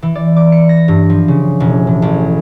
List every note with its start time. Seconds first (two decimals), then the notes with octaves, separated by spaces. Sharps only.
0.02 E3
0.15 D5
0.36 D6
0.52 C#7
0.69 A#6
0.88 G2
1.09 F3
1.28 C#3
1.60 E1
1.87 A2
2.02 A1